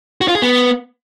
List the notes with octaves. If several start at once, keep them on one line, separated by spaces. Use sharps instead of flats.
F#4
F4
G#4
B3